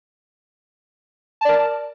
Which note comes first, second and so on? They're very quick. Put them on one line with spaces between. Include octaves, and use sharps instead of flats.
A5 D5 A#4